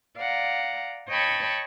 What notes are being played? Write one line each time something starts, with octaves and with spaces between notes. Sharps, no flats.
D5 F5 F#5 A#5
C#5 D#5 G5 A5 B5 C#6